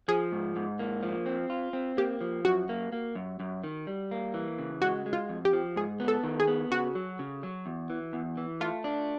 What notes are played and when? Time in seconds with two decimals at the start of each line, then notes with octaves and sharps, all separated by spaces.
0.08 F3 G#4
0.32 G#2
0.56 G#2
0.79 A#3
1.03 F3
1.26 C4
1.50 F4
1.73 C4
1.97 A#3 G4
2.21 F3
2.45 F#2 F#4
2.69 A#3
2.92 A#3
3.15 F#2
3.40 F#2
3.63 D#3
3.87 G3
4.11 A#3
4.34 E3
4.59 C#3
4.82 G#3 F#4
5.06 G#3
5.13 F4
5.29 F2
5.45 G4
5.53 F3
5.76 G#2 G#4
6.00 B3
6.08 A4
6.23 D#3
6.40 G#4
6.47 B3
6.71 C#3 F#4
6.95 F#3
7.19 C#3
7.43 F#3
7.66 E2
7.90 E3
8.13 E2
8.37 E3
8.60 A3 F4
8.84 D4